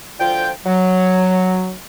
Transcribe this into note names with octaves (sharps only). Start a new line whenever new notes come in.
D2 D3 F3 F4 G5
F#3